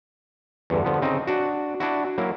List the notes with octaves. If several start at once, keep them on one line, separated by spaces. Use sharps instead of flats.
E2 G2 D3
D3 F3 B3
C#3 C4 D#4
D4 F#4
D4 E4 F#4
F#3 A#3 E4